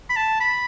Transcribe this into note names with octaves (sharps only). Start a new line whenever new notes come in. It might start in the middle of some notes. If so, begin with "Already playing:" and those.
B5
A5
B5